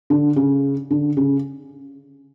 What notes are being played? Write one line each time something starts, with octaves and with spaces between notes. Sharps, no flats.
D3
C#3
D3
C#3